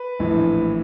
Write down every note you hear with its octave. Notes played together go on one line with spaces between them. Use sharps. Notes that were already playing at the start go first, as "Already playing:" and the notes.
Already playing: B4
A#1 A2 E3